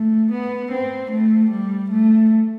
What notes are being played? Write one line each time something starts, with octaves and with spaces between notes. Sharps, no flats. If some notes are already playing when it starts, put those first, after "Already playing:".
Already playing: A3
B3
C4
A3
G3
A3